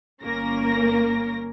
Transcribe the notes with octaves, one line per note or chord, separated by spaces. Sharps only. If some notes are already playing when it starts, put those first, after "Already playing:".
G1 A#3 C#4 A#4 A#6